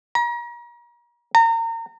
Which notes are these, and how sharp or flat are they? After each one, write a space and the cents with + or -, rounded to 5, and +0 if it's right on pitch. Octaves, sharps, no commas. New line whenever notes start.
A#5 +40
A#5 -30